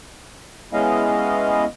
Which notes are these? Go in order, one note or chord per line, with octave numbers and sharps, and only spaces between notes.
G#3 B3 C#4 E4 D#5 F5